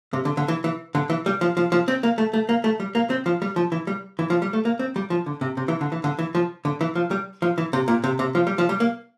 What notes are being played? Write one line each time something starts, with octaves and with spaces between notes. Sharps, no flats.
C3
D3
D3
E3
E3
D3
E3
G3
F3
F3
F3
C4
A#3
A3
A3
A#3
A3
G3
A#3
C4
F3
G3
F3
E3
G3
E3
F3
G3
A3
A#3
C4
G3
F3
D3
C3
C3
E3
D3
E3
D3
E3
F3
D3
E3
F3
G3
F3
E3
C3
A#2
C3
C3
F3
G3
F3
G3
A#3